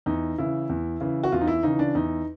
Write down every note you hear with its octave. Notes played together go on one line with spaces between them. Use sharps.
E2 D#4
C#3 E3 E4
E2
C#3 E3
F#4
E2 F4
D#4
E4
C#3 E3 D#4
D4
E2 D#4